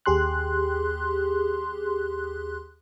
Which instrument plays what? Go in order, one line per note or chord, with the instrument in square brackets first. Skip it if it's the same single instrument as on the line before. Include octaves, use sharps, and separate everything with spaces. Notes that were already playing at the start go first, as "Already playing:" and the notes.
[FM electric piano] D#2 G4 G#4 C6 F#6